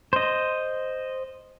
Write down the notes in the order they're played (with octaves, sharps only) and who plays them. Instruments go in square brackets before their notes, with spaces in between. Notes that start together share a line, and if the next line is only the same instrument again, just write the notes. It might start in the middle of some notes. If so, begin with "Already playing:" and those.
[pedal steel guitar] C5 D#5